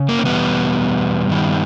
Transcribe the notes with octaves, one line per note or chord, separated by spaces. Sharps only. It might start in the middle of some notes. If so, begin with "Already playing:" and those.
Already playing: C#3
A#3
C#4
E2 B2 G3 B3
G2 D#3 G3